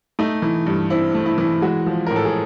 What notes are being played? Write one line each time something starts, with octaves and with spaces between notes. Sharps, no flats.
A3 D#4
E3
G2
C4 E4
A3
E4
E3
G#3 F#4
F3
A2 A#4
A4
G#4